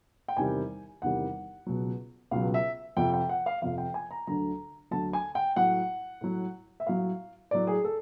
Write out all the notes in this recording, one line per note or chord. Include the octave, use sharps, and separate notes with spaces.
G5
E2 C3 D#3 G3 G#5
E2 C3 D#3 G3 F#5
C#2 B2 F#3
C#2 B2 F#3 F5
E5
F2 C3 F3 G5
G5
F#5
F5
F2 C3 F3 F5
G5
G#5
A#5
D2 D3 F#3 A#5
D2 D3 F#3 A5
G#5
G5
A2 F#3 F#5
A2 F#3
E5
A2 F#3 F5
A2 F#3 D5
G#4
A4